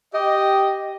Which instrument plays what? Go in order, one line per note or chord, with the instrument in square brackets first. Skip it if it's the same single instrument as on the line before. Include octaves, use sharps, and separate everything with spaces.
[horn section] G4 D#5